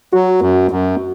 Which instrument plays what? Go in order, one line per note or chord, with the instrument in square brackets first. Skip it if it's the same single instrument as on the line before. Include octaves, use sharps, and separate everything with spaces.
[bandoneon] F#3 [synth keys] F#4
[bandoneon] F#2
F#2